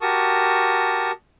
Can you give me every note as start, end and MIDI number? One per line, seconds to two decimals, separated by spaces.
0.02 1.11 66
0.02 1.11 67
0.02 1.11 70
0.02 1.11 81
0.02 1.11 85
0.02 1.11 87